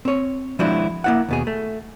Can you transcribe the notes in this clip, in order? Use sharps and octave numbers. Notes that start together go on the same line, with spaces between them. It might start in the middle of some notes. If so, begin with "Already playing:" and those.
C4 C#5
F3 G#3 D4 E4 F#4 C5
A#3 E4 F#5
D#2 B2 G#4
A3